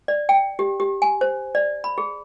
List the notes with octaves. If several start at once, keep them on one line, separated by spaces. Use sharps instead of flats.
D5
G5
G4
G4
G#5
C5
D5
B5
G#4